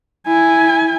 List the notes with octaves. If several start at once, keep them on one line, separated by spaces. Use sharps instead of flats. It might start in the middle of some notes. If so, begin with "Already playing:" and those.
E4 G#5